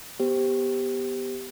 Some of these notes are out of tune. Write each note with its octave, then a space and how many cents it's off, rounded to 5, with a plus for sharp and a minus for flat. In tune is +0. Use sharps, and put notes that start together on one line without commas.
B3 +0 G4 +0 C5 +0